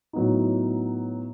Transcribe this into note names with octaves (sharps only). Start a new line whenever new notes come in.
A2 F#3 B3 D#4